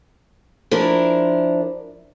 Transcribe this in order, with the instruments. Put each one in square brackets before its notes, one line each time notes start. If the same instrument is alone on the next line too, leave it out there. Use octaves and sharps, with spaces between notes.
[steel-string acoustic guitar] F3 D4 E4 A#4